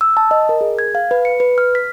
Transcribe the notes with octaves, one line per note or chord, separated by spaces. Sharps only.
E6
A5
D#5
A#4
G#4
G#6
F5
B4
C#7
B4
F6
B6